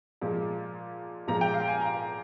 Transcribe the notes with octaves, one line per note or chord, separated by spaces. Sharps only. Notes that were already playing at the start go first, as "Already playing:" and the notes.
A#2 F3 G#3
A#2 F3 G#3 A#5
G5
F5
G#5
A#5